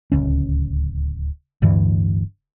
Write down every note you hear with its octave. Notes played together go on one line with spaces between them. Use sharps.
D1 C#2 C#4
D1 D2 G2 E3